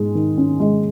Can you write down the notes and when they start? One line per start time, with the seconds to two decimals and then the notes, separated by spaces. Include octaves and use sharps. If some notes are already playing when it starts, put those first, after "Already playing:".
Already playing: G#2 G#3
0.15 D#3
0.38 C#4
0.60 G#3